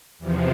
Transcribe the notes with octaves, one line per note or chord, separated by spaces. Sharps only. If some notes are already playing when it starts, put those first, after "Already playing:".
E2 C3 F3